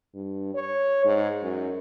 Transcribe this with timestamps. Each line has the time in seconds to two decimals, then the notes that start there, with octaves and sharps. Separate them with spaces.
0.15 G2
0.54 C#5
1.05 G#2
1.43 F#2